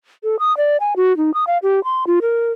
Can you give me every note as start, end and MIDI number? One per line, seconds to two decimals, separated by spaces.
0.24 0.36 69
0.39 0.55 87
0.57 0.77 74
0.80 0.94 80
0.96 1.16 66
1.17 1.33 63
1.34 1.44 87
1.47 1.58 77
1.63 1.83 67
1.84 2.04 84
2.07 2.19 65
2.22 2.52 70